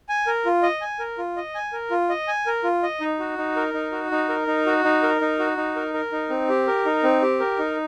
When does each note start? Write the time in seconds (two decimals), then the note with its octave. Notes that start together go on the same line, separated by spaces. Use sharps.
0.09 G#5
0.27 A#4
0.45 F4
0.63 D#5
0.81 G#5
0.99 A#4
1.18 F4
1.37 D#5
1.55 G#5
1.73 A#4
1.91 F4
2.09 D#5
2.28 G#5
2.46 A#4
2.64 F4
2.83 D#5
3.01 D#4
3.19 F#4
3.38 D#4
3.56 A#4
3.74 D#4
3.92 F#4
4.11 D#4
4.29 A#4
4.47 D#4
4.66 F#4
4.84 D#4
5.03 A#4
5.21 D#4
5.39 F#4
5.57 D#4
5.76 A#4
5.94 A#4
6.12 D#4
6.30 C4
6.49 G4
6.68 A#4
6.86 D#4
7.04 C4
7.22 G4
7.40 A#4
7.59 D#4